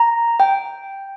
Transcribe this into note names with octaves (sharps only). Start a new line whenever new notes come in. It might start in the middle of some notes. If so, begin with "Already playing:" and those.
Already playing: A#5
G5